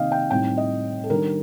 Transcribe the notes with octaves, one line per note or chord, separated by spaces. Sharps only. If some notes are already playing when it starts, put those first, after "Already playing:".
Already playing: C3 D#3 A#3 D#5 F5 G5
G5
A2 G3 C4 D#4 G5
D#5
A4
D#3 G3 D4 A#4